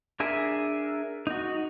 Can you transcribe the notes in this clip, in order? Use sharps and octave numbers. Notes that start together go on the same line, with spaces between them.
D4 G#4 A#4 E5 G#5
D#4 F#4